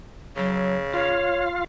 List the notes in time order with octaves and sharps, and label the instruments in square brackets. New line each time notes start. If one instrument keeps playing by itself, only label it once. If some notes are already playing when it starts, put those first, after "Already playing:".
[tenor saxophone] C#3 [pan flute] F#3
[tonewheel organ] F4 F5 [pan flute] C#5